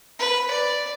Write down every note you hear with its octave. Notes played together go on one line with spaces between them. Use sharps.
B4
D5